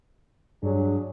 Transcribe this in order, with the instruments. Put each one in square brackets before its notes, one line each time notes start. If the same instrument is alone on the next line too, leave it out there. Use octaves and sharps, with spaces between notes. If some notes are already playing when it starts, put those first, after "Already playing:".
[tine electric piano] G2 [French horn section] F#3 D4 G#4